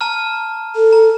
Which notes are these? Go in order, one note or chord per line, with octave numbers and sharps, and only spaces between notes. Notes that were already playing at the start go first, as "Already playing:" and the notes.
A5 A#5 F6
A4
A#5